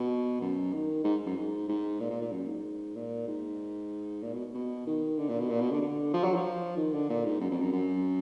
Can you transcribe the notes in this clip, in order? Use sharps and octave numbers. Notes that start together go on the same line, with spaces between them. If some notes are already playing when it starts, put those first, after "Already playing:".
Already playing: B2
F#2
D#3
G#2
F#2
G#2
G#2
A#2
A#2
A#2
F#2
G#2
A#2
G#2
A#2
B2
B2
D#3
D3
A#2
B2
A#2
B2
D3
D3
F3
F#3
F3
D#3
D3
A#2
G#2
F#2
F2
F#2
F#2